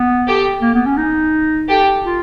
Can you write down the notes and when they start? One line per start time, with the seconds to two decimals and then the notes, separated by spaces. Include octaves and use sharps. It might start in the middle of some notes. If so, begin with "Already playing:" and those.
Already playing: B3
0.27 G4 A4
0.62 A#3
0.74 B3
0.86 C#4
0.97 D#4
1.69 G4 A4
2.05 F4